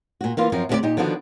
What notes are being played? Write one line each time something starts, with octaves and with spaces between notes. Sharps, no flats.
A#2 F#4
E3 A#3 F4
F#2 F3 C4 A#4
D2 C3 D4 E4 G4 D5
A#2 D#4 G4
D3 D#3 F3 B3 D4 F#4